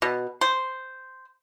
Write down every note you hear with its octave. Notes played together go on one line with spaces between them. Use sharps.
B2
C5